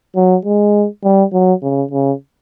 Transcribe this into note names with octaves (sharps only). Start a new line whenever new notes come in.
F#3
G#3
G3
F#3
C#3
C#3